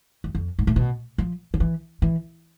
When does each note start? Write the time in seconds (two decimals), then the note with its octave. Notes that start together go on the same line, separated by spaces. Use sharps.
0.24 E2
0.35 F2
0.59 G#2
0.67 A2
0.76 B2
1.18 F3
1.54 D3
1.60 E3
2.02 E3